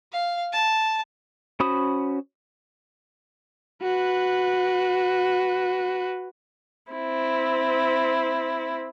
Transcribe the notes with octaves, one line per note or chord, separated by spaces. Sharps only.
F5
A5
C#4 F#4 C5 B5 D#6
F#4 B4
C4 E4